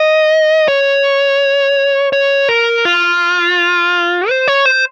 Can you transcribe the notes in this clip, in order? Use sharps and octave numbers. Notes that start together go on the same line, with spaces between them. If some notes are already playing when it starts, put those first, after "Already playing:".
Already playing: D#5
C#5
C#5
A#4
F4
C5
C#5
C5